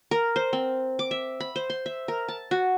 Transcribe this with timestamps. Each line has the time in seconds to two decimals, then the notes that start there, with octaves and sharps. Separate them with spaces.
0.11 A#4
0.36 C5
0.53 C4
0.99 D6
1.11 E5
1.40 B5
1.56 C5
1.70 C6
1.86 E5
2.08 A#4
2.29 A5
2.51 F#4